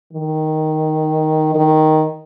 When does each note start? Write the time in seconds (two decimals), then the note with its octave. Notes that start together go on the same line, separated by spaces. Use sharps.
0.13 D#3
1.55 D#3